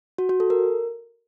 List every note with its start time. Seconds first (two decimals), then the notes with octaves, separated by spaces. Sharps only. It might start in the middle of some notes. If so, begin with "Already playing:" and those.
0.18 F#4
0.29 F#4
0.40 A4
0.50 A#4